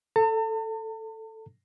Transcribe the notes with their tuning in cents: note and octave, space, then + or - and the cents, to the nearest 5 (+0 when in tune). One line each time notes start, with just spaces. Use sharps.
A4 +0 A5 +40